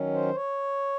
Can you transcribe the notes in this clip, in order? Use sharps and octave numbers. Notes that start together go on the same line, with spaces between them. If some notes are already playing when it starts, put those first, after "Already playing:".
Already playing: D#3 F#3 C#4
C5
C#5